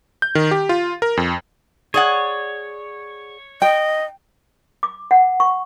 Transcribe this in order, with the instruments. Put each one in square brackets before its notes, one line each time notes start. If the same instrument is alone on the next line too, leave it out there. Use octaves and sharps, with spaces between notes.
[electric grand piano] G6
D#3
G4
F4
A#4
F2
[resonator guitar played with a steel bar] G#4 D5 F#5 [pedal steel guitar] C#5
[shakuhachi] D#5 [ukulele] G5
[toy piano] D6
F#5
C#6